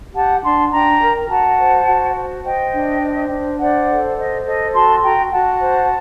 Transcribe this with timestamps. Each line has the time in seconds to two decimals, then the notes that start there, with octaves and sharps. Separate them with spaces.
0.14 G4 F#5 A5
0.43 D4 A5 C6
0.71 D4 G5 A#5
1.01 A#4
1.29 F#4 F#5 A5
1.58 C5
1.86 F#4
2.16 C5
2.44 C5 D#5 G5
2.73 D4
3.02 C5
3.30 D4
3.59 C5 D5 F#5
3.88 A4
4.17 C5 D#5
4.45 A4 D#5
4.74 F#4 A5 C6
5.03 F#4 G5 A#5
5.32 F#4 F#5 A5
5.60 C5